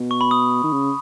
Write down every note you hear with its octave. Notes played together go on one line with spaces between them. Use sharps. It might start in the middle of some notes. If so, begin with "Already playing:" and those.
Already playing: B2
C#6
B5
D#6
D#3
C#3